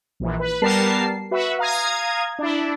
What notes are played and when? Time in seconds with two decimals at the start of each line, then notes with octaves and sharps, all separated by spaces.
0.20 A#1 E3
0.39 B4
0.62 G3 B3 A#4 A5 C7
1.31 F#4 B4 E5
1.59 F5 A#5 D#6 G#6
2.39 D4 E4